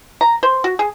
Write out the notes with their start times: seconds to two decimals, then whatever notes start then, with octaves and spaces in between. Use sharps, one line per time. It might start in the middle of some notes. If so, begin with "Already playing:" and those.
0.21 A#5
0.43 C5
0.64 F#4
0.79 G#4